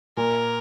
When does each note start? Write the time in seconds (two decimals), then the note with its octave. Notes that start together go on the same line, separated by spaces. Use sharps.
0.17 A#2 A#4